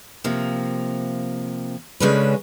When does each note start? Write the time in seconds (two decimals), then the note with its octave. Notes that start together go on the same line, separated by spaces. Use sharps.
0.24 C3 F3 A#3
2.00 C#3 G#3 C#4 D4 A4 B4